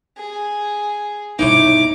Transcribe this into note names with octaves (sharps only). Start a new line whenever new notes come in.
G#4
G2 B2 D#4 E4 C#5 D6